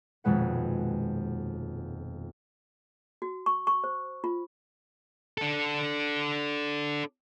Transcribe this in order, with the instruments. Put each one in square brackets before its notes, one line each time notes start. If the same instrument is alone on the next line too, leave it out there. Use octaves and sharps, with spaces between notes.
[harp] D#1 F2 B2 G#3 B4 F#5
[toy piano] F#4
C#6
C#6
C5
F4
[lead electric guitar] D4 A4